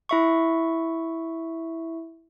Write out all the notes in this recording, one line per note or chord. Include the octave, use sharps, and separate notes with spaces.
E4 E5 C#6